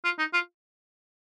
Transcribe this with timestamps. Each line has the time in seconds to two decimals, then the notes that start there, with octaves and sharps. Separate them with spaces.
0.05 F4
0.19 D#4
0.33 F4